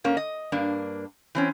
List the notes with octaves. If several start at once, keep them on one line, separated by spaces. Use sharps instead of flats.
G#2 A#3 C#4
D#5
G2 A#3 D4
E3 C4 C#4